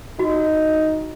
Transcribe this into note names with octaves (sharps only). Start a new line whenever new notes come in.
D#4 F#4